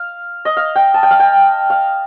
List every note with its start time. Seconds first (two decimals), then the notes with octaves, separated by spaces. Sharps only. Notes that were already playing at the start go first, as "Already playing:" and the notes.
Already playing: F5
0.45 D#5
0.57 F5
0.75 G5
0.94 A5
1.03 G5
1.11 F5
1.20 G5
1.70 F5